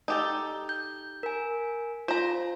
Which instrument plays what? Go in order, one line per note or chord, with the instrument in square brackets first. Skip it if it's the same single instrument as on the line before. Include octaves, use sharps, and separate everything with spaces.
[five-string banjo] D#4 G4 A4
[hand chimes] G6
A#4 G#5
[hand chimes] F4 [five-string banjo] C5 A#5